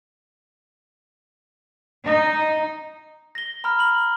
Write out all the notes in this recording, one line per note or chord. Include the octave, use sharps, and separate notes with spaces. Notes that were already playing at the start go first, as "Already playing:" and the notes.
D#4
A#6 G7
A#5 B5 F6
B5 F#7